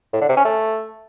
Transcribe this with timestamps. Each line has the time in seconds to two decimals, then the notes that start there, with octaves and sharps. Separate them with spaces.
0.13 A2
0.21 D3
0.29 C3
0.37 C#4
0.45 A3